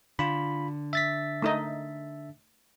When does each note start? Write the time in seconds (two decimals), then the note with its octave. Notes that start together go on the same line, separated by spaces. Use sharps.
0.19 D3 F4 B5
0.93 E5 A6 B6
1.42 A3 D#4 D#5